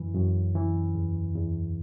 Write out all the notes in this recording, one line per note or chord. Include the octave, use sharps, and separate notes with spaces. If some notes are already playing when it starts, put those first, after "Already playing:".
Already playing: F#2 E3
F#2
E3
E2
E2